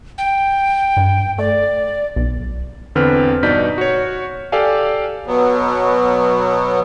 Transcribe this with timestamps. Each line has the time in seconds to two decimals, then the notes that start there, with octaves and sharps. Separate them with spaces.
0.18 G5
0.97 G2
1.38 A3 D5
2.16 B1
2.95 E2 D3 C4 B4 F6
3.43 G2 B2 D#4 D5 G6 B6
3.78 F#4 C#5
4.52 G4 A4 D5 F5 G#5
5.26 B2 F#3 B3